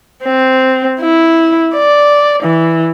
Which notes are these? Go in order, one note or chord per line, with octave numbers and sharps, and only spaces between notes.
C4
E4
D5
E3